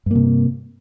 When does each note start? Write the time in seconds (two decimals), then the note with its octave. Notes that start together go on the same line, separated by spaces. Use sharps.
0.06 G2
0.11 A#3
0.15 C3